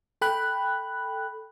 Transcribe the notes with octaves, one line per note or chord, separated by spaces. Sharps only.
A4 G5 B5 F#6